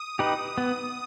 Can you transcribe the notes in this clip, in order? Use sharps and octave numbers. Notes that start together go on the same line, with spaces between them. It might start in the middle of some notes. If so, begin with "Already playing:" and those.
Already playing: D#6
D#4 G4 B4
B3